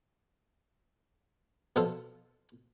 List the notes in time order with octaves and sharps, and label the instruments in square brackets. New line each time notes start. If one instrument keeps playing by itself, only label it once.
[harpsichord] B2 F3 F4 A4 A5